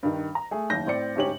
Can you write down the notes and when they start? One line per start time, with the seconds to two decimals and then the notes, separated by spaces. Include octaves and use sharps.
0.03 G2 D#3
0.35 A#5
0.51 A3 G#4
0.70 F#1 D#2 G6 A#6
0.86 A2 C4 D5 C#7
1.16 D2 G#2 C#4 G4 C#5 F#7